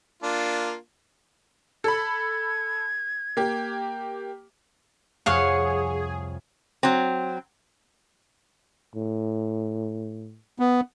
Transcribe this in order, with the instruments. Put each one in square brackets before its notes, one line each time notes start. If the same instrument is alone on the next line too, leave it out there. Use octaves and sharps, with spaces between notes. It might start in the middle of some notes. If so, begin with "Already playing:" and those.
[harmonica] A#3 D4 F4
[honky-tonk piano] A4 B5 [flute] G#6
[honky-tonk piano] A#3 G4
[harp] C2 F2 [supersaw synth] G#4 [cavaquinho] C#5 F5 F#5
[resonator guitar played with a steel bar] F#3 C4
[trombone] A2
[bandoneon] B3